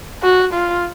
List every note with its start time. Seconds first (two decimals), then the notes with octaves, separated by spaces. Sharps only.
0.23 F#4
0.53 F4